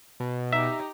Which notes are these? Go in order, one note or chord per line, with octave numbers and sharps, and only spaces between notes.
B2
D#4 G4 E5 A#5